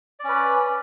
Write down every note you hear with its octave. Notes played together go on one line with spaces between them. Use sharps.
C#4 B4 D5